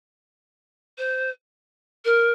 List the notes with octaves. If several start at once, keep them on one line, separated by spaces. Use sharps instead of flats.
C5
A#4